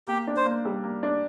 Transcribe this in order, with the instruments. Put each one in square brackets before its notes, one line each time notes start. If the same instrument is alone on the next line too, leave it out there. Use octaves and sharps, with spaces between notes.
[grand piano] A#3 [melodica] G4
[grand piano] D4
[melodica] C5
[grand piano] A#3
G3
A#3
D4